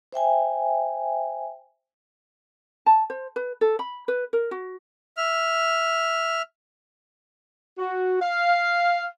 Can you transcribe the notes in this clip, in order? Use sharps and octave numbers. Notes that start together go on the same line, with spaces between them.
C5 E5 G5 G#5
A5
C5
B4
A4
B5
B4
A#4
F#4
E5 F6
F#4
F5